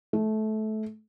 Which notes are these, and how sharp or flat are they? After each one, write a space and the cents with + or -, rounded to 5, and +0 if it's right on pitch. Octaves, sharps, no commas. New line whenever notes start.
A3 -20